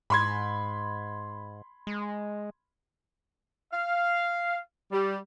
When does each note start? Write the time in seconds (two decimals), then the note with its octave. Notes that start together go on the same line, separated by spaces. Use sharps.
0.10 G#2 B5 C6 G#6
1.87 G#3
3.73 F5
4.92 G3